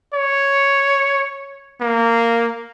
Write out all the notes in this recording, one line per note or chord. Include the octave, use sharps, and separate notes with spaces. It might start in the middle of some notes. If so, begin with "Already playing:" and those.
C#5
A#3